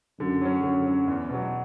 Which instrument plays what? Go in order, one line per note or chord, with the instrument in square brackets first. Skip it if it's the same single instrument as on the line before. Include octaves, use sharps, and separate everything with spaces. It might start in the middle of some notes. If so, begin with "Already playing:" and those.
[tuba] F#2 [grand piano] D3
[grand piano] F#3 C#4
[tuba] F#2 [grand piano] D3
[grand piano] F#3 C#4
E2
B2 F#3